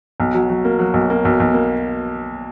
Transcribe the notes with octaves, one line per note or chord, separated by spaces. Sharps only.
B1
F#3
F#3
A#3
F#3
B1
A#3
B1
B1
A#3